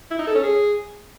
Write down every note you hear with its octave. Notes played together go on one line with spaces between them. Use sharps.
E4
D#4
A4
C#4
G#4